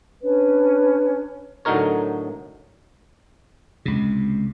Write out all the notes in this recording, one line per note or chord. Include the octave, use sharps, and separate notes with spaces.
C#4 D4 B4 C#5
A2 D3 F#3 D#4 A#4 C#5
C#2 C3